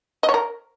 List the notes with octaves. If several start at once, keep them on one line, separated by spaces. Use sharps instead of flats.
D#5
C#5
A#4